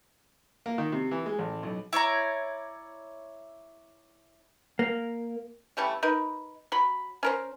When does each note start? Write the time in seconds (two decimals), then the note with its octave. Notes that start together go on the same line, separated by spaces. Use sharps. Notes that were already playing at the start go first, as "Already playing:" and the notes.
0.66 A#3
0.78 D#3
0.92 C3
1.11 E3
1.26 G#3
1.38 A1
1.63 B1
1.93 E4 C#5 D5 A#5
4.79 A#3
5.77 E3 G3 A3 C#4
6.03 D#4 A#4 B4
6.72 F#3 B5
7.23 C#4 A#4 C5